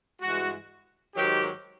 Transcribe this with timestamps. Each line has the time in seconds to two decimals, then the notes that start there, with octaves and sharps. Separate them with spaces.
0.21 G2 E3 G#3 F#4
1.15 G#2 D#3 F#3 G4